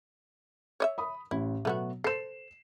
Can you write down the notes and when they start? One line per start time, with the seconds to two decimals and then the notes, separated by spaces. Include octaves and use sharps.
0.80 C#5 D#5 E5
0.98 B5 D#6
1.31 A1 E4
1.65 B2 F#3 A3 B3 F#4
2.04 A4 C5 C7 E7